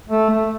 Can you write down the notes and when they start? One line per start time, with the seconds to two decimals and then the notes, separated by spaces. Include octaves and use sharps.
0.09 A3
0.30 A3